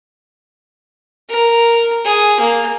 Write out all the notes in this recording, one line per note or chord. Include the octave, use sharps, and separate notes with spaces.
A#4
G#4
A#3